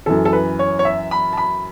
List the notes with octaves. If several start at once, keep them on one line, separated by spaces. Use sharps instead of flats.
F#2 E3 A4
A4
B4
C#5
C#5
E5
B5
A5
B5